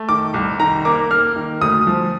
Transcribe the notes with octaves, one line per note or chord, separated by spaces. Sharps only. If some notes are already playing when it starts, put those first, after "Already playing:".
Already playing: A3
D#3 D6
C2
D#3 A#5
A#3 D6
A#3 F6
D#3
D2 D#6
F3